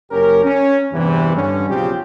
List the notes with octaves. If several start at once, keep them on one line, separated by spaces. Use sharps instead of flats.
F#1 C#4 G4 A#4
C#4
E2 G2 C3 E3
G2 D3 C#4
B1 C#3 F3 C4 F4 G4